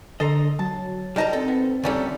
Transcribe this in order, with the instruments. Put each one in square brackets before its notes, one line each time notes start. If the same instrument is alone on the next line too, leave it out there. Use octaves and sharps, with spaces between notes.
[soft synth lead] D3 [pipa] A4 C5 A#5 [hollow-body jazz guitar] D#5
[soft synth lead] F#3 [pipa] A5
[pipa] D#3 D#4 A5 [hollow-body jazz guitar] G3 D#5 A#5
[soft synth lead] C4 [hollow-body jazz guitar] A4
[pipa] B3
[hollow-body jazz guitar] D2 D#3 G3 [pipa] F3 C#4 A4